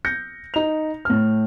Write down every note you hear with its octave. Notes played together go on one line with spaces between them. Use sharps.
G6 A#6 C#7
D#4 F7
A2 F6